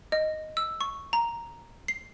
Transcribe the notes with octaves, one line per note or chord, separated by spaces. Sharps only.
D#5
E6
C#6
A#5
C7